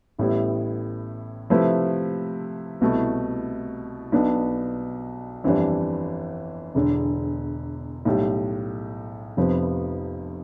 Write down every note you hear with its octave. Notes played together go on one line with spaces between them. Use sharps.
A1 A2 G3 B3 E4
C3 F3 A3 E4 B4
C2 B2 A3 E4
B1 B2 B3 D4
G1 F2 E3 G3 D4
E1 E2 D3
B1 A2 G3
F1 F2 C3 F3 B3